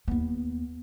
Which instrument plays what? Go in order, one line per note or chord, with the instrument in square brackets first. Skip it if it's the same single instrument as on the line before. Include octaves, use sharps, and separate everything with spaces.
[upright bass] D#2 B3